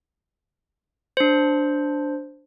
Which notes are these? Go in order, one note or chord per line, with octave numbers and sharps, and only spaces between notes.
D4 C5